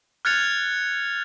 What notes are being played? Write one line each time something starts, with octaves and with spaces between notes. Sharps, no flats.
F6 F#6 G#6 A6 C#7 F7